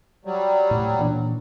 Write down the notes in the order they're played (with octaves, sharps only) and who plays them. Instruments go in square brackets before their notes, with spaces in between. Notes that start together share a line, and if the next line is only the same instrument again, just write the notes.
[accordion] F#3 G3
[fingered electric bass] A2
A#2 E3 D4